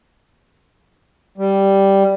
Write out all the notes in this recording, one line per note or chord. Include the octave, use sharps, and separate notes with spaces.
G3